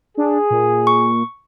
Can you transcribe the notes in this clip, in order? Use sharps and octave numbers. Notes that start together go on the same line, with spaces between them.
D4 G#4
A#2
C#6